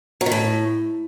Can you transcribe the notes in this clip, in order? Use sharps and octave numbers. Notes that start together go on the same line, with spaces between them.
F#3
D#3
A2